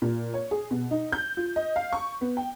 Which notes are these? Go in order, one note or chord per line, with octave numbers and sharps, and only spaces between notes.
A#2
C#5
G#4
B2
D#4
G6
F4
D#5
F5
C#6
B3
G5